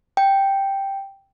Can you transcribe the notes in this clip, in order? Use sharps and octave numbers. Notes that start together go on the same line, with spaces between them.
G5